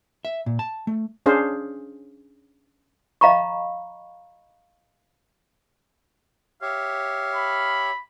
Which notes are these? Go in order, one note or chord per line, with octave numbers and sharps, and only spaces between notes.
E5
A#2
A5
A3
C#4 D4 G#4 C5 F5
D#5 F5 A#5 B5 C#6
G4 C#5 E5 F5
B5